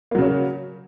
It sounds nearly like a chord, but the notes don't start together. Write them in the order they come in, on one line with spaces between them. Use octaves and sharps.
A#3 F#3 C#3 C#4